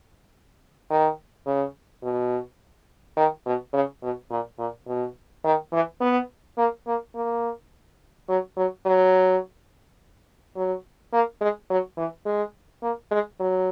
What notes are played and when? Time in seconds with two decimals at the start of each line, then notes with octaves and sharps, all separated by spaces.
0.90 D#3
1.46 C#3
2.03 B2
3.17 D#3
3.46 B2
3.73 C#3
4.03 B2
4.30 A#2
4.58 A#2
4.87 B2
5.44 D#3
5.72 E3
6.01 B3
6.58 A#3
6.87 A#3
7.15 A#3
8.29 F#3
8.57 F#3
8.86 F#3
10.56 F#3
11.13 A#3
11.41 G#3
11.70 F#3
11.97 E3
12.26 G#3
12.82 A#3
13.11 G#3
13.40 F#3